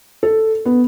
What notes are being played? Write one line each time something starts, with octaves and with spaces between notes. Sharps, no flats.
A4
B3